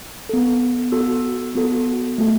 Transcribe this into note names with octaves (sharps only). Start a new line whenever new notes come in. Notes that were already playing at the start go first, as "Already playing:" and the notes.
B3 A4
B3 F#4 A4 E6
B3 F#4 A4
A3 F#4 A4